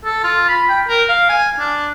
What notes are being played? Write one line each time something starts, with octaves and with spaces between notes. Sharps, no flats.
A4
F4
B5
G5
A#4
F5
G#5
D4